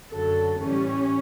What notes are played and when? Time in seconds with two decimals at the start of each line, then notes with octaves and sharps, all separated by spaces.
0.11 F#2 D3 F#3 A4
0.60 A2 E3 G3 C#4